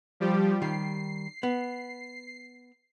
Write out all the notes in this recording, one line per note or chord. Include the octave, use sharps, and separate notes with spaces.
F3 G3 G4
D#3 G3 C7
B3